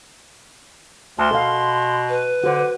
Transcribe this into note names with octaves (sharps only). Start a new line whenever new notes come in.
D2 A5 C6
B2 A4 F5
B4
D3 F#4 C5